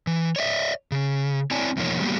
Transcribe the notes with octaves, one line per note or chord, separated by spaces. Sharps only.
E3
C#5 D5 E5
C#3
C4 E4 C#5 D5 G#5 A5
E2 B2 F3 A#3 D#4 C#5
F#3 G3 A#3 B3 F#4 G4